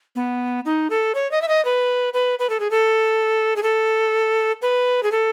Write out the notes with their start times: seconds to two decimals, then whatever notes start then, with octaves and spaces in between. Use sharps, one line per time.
0.16 B3
0.65 D#4
0.90 A4
1.15 C#5
1.31 D#5
1.42 E5
1.48 D#5
1.65 B4
2.14 B4
2.39 B4
2.50 A4
2.60 G#4
2.71 A4
3.56 G#4
3.63 A4
4.62 B4
5.03 G#4
5.12 A4